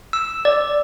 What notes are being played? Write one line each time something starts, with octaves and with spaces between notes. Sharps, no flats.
E6
D5